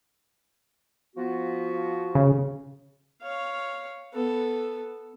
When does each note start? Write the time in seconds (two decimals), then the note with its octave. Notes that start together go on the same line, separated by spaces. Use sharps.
1.16 F3 B3 F#4
2.15 C#3
3.22 C#5 F5
4.13 B3 A4